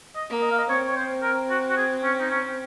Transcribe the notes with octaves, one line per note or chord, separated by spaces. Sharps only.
D#5
A#3
D#5
F5
D#5
C4 C#5
C#5
C5
A#4
F#4
F#4
G#4
C#4
D#4
C#4